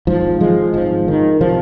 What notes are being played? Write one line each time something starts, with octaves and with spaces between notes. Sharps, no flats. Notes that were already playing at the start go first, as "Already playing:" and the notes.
G#1 G#2 F3
F3 G#3
G#1 G#2 F3
D#3
C3 F3